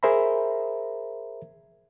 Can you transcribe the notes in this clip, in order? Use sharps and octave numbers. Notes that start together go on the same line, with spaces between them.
G#4 A#4 C5 E5 A#5 B5